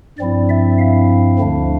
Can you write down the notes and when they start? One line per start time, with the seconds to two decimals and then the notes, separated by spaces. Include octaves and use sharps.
0.18 G2 F3 C4 E4 D5
0.49 E5
0.79 F5
1.39 D2 D3 F3 A3 D4